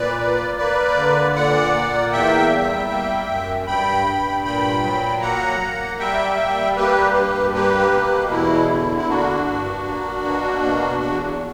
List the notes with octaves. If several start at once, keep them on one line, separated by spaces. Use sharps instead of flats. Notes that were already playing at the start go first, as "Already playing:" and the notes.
Already playing: A#2 B4 D5
A#3
A#3 B4 D5
D3
A#2 D5 F#5
A#3
E2 E5 G5
G3
A#3
F#2
G2 G5 B5
G2
A#2 G5 B5
F#3
A#3 F#5 A#5
A#3
G3 E5 G5
G3
A#3 G4 B4
G2
A#3 G4 B4
B2
E2 E4
D3
E4
A#3 D4 F#4
G2
A#3
B2
A#3
E2